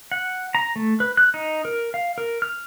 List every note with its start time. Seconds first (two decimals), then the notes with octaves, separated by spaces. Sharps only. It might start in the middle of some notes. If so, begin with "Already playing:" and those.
0.12 F#5
0.55 A#5
0.76 A3
1.00 B4
1.17 F#6
1.34 D#4
1.65 A#4
1.94 F5
2.18 A#4
2.42 F6